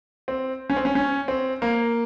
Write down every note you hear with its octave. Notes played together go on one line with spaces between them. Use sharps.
C4
C#4
C4
C#4
C#4
C4
A#3